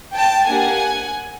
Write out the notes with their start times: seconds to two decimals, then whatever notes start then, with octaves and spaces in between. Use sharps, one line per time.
0.14 G5 A5
0.47 A#3 D4 G4 F#5 G#5